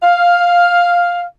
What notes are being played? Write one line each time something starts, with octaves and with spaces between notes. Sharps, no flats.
F5